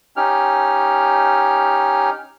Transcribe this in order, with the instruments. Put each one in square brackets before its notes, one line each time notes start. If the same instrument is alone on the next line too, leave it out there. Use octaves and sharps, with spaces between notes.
[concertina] C#4 D#4 G4 F6